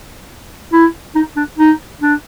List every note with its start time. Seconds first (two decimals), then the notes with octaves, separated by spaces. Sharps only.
0.73 E4
1.15 D#4
1.36 D4
1.58 D#4
2.01 D4